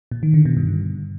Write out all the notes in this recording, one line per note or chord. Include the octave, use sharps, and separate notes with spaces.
A#2
D#3
D3
B2
G2